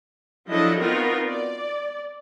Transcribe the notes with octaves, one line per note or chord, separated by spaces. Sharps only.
F3 F#3 D4 E4 A4 D#5
B3 C4 D#4 F4 F#4 A#4
D5